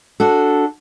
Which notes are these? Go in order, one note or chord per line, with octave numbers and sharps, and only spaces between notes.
D4 F#4 A4